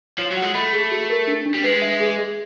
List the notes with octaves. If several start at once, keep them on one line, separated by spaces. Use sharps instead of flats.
F3 C#5
F#3
F#5
G#3
A3 B5
G#4
F#4
A#4
D4
D4
G3
G#3 B4
E5
G#4
G#4